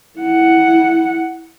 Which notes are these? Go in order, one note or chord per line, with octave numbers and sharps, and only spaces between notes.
E4 F#5